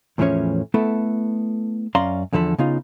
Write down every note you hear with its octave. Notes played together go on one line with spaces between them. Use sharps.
E2 A2 E3 F3 C#4 C#5
A3 B3 E4 A4
F#2 C#4 D5 F5 A#5 C6
E2 D3 F3 A4 B5
C#3 B3 D#4 F4